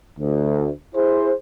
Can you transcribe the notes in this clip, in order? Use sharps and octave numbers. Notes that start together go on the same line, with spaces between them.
D2
E4 G#4 C5